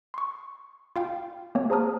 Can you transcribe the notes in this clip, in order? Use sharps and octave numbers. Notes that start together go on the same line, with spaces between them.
C6 C#6
F4 F5 G5
A#3 C4 C#5
G#4 C5 A5 A#5 D#6 F6